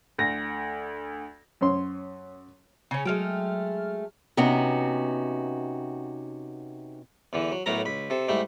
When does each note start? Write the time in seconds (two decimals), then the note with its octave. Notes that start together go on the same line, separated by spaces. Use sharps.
0.18 D2 A#6
1.61 F#2 C#5 C6
2.91 C#3 C#4
3.05 F#3 G#3 A3 G5 F6
4.37 C3 B3 C#4 D#4 F#4
7.33 E2 D3 E3
7.52 F#3
7.66 B1 A2 F#3 B3 A#4 A#5
7.85 C#2 B5
8.10 C3 A4
8.28 G#2 G3 A3 E4